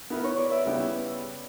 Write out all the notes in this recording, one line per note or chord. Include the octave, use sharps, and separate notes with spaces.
B3 E4 A#4 B4
C#5
D5
E5
C#3 G3 B3 E4 G4